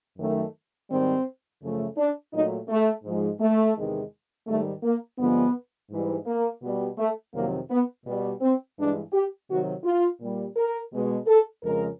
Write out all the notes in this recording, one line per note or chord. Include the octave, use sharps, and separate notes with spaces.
F#2 D#3 F#3 A3
G#2 D#3 G3 C4
F#2 C#3 F3 A3
D4
A#2 F#3 A3 D#4
A3
G#2 F3 G#3
A3
E2 C3 D#3 G#3
G#2 D#3 G3 A3
A#3
G2 D3 F3 G#3 B3
G#2 E3 G3
A#3
B2 G3
A3
F2 C3 D#3 F#3 A#3
B3
B2 G3
C4
G2 E3 G#3 D4
G4
C3 D#3 F#3 F#4
F4
A#2 G3
A#4
B2 G#3
A4
F2 C#3 F3 G#3 A#4